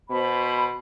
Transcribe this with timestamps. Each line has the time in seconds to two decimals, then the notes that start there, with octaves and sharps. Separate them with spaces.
0.10 B2 C5 B5